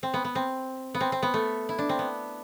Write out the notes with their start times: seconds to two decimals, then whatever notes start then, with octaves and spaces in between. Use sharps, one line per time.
0.03 C4
0.14 B3
0.25 B3
0.35 C4
0.94 B3
1.01 C4
1.12 C4
1.23 B3
1.34 A3
1.69 E4
1.79 D4
1.89 C4
1.99 B3